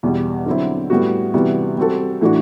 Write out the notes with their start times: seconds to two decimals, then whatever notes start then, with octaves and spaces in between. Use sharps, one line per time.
0.03 E2 B2 G3
0.46 D3 F#3 C4 E4
0.90 A2 G3 B3 F#4
1.34 C3 E3 G3 B3 F#4
1.78 G3 C4 F#4 A4
2.21 A2 E3 A3 D4 F#4